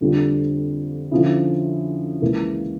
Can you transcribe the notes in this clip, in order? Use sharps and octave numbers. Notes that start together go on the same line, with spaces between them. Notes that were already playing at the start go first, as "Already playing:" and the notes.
F2 D3 G3 D4 F4
D3 F3 C#4 E4
C#2 C#3 E3 A#3